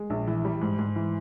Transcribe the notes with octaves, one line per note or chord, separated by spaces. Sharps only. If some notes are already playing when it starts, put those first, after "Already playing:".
Already playing: G#3
A#1
E3
G3
G#2
G#2
E3